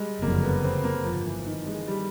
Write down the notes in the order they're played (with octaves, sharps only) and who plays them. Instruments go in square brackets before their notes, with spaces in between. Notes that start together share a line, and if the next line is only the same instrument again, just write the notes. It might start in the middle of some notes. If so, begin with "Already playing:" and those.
Already playing: [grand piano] G3 G#3
[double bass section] F#1 F2 D3 F#3 [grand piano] A#3
[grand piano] B3
C4
A#3
[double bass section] G1 F2 C3 [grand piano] F3
[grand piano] E3
D#3
G#3
G3